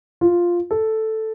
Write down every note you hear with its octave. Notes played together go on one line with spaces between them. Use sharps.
F4
A4